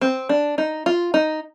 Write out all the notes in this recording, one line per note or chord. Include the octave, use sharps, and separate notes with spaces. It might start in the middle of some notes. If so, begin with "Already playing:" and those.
C4
D4
D#4
F4
D#4